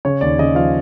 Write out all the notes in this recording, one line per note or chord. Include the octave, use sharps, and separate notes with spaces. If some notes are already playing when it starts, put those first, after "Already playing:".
C#3 C#5
D#2 D5
C#3 D#5
F3 F5